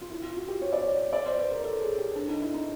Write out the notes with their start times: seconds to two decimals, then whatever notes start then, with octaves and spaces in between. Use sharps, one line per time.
0.01 F4
0.10 E4
0.23 F4
0.36 F#4
0.48 G4
0.62 C#5
0.73 D5
0.83 C#5
1.13 D5
1.25 C5
1.38 B4
1.51 A#4
1.64 A4
1.82 G#4
1.99 G4
2.16 D4
2.29 D#4
2.42 E4
2.54 D#4